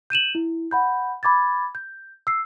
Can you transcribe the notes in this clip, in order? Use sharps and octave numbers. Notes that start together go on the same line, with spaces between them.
G6 D#7 E7 F#7
E4
F#5 B5 G6
B5 D6 G#6 A6
G6
E6 C7